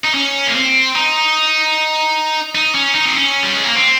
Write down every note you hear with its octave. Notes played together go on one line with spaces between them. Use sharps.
D#4
C#4
A#3
C4
D#4
D#4
C#4
D#4
C4
C#4
G3
G#3
A#3
C4